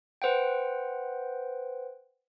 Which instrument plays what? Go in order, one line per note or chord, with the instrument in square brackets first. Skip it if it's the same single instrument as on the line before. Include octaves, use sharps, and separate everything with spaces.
[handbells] B4 C5 F#5 G5